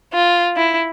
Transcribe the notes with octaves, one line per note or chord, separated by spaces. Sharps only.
F4
E4